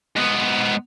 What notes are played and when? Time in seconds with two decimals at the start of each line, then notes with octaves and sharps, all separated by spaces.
0.16 G#2 B3